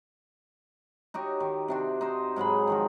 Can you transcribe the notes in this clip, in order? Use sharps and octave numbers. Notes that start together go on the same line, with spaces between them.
D#4 F#4 G4 C#5
D#3
C3 D4 F#4
D#4 C5
G#2 F#3 G#4 B5
D#3 F3 F#4